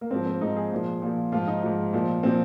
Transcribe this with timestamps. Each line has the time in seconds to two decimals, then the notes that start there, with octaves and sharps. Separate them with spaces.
0.01 A#3
0.11 G#2 F3 C4
0.26 C4
0.41 G#2 F3 D#4
0.56 G#4
0.71 A#2 F3
1.02 A#2 F3
1.32 G#2 F3 F4
1.47 D#4
1.63 G#2 F3
1.93 A#2 F3
2.23 A#2 F3 C4